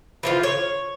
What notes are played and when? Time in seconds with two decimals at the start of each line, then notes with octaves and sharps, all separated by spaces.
0.23 E3 F3 F4
0.43 C#5